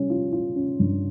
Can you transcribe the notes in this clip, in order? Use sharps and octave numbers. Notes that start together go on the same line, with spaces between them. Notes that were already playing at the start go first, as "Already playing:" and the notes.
Already playing: G3 C#4
F4
F4
C#4
G2